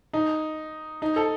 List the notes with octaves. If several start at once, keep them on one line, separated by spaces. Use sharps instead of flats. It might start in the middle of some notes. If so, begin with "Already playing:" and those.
D#4
D#4
A4